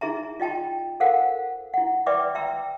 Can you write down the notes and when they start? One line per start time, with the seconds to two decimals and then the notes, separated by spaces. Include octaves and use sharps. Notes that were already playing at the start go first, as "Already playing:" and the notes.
0.01 D#4 E4 G#4 E5 A#5
0.40 F4 D#5 G5 A5 B5
1.00 A4 A#4 C5 F5 F#5
1.74 E4 F#5
2.06 B4 D5 E5 G5 B5 D6
2.35 E5 G5 A#5 B5 E6